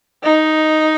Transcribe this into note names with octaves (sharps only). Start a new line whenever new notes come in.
D#4